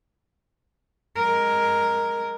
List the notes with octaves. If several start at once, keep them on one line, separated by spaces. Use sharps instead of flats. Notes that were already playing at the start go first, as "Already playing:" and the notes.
G#3 A#4